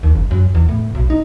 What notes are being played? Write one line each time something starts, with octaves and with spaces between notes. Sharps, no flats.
D#2
F#1
F#2
E2
A2
B1
D#4